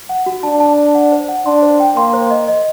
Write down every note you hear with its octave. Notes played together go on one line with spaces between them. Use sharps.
F#5
F#4
D4 A5
A5
A5
F#5
C5
F#5
D4 C6
C5
G5
A#3 C6
C5
D#5
D#5